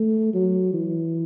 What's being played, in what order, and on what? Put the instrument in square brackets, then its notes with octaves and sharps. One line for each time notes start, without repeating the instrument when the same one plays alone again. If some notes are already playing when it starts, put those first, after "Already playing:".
Already playing: [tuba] A3
F#3
E3